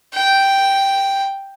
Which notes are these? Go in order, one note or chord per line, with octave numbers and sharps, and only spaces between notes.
G5